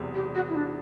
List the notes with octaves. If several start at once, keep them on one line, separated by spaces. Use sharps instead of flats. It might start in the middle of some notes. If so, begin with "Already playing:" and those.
Already playing: E1 E2 C3 F#3
G4
F#4
E4
D4